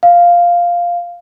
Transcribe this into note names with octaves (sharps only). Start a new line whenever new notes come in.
F5